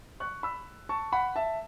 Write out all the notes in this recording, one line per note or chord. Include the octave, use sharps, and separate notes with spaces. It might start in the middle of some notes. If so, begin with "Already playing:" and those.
C#6 F#6
B5 E6
A5 C#6
F#5 B5
E5 A5